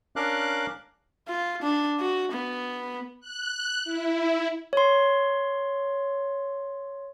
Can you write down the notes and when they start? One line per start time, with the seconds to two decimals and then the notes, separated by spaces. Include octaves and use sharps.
0.16 C#4 D4 A#4 F5 D6 F#6
1.28 F4
1.62 D4
2.00 F#4
2.32 B3
3.20 F#6
3.84 E4
4.73 C#5 C6